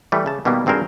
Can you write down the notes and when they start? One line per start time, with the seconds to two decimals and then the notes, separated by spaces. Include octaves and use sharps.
0.12 E3 G3 A3
0.26 C#3 A5
0.45 B2 D#3 G3 A#3 B3
0.66 G#1 G2 C4 G#4 A#4 C5